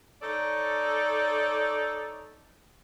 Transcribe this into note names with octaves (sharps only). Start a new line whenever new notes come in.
D#4 A4 C#5 D5